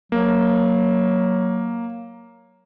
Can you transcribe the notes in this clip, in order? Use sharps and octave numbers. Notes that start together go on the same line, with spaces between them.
F#3 A#3